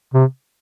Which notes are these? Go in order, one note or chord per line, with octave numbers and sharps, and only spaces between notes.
C3